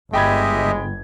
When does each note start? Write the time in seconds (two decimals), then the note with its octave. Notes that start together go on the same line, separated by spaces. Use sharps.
0.13 G1 G#3 G4 D#5 E5 G5 B5 G#6